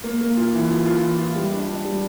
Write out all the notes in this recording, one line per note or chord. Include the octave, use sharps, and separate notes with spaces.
A#3
A#3
F4
E3
F4
F4
E3
F4
G3
D4
D4
G3